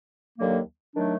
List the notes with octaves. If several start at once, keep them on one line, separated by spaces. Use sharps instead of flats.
D#2 D3 F#3 A#3
D#3 F#3 A3 D4